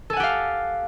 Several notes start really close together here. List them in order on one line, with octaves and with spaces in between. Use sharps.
A4 G#5 F#5 G4 F5